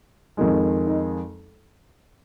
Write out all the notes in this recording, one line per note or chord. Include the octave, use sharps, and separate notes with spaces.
F2 D#3 G#3
D#4